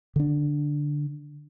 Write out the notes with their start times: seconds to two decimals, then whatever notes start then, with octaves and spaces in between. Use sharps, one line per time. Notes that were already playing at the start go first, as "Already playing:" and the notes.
0.16 D3 D4